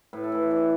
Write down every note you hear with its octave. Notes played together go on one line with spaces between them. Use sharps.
A2 B4
A4
E3 B4
E3 D4